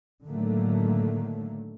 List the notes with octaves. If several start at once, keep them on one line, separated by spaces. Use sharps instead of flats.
A2 D3 D#3 F#3 A3 A#3